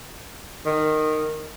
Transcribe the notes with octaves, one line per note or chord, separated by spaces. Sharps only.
D#3